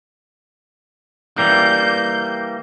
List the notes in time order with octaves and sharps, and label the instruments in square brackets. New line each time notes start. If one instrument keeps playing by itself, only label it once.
[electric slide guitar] E3 G3 A#3 [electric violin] G6